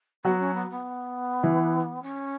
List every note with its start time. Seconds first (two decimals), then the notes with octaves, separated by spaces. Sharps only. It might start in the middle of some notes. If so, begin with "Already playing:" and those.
0.25 F#3 B3 F#4
0.40 C#4
0.54 B3
0.70 B3
1.43 E3 E4
2.03 C#4